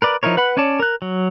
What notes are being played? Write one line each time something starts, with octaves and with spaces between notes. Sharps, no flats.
A#4 B4 D5
F3 D#4 E4 A#4 C#5
B4 F#5 B5
C#4 C#5 D5 A5
A#4 F#6
F#3